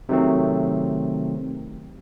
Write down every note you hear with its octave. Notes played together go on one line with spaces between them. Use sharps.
C3 D#3 F#3 A3 C4